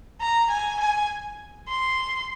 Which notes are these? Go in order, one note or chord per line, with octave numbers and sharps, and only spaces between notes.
A#5
G#5
G#5
C6